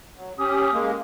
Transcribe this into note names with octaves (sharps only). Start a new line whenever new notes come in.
F#3
C#4 G4 D#6
G#3 A#3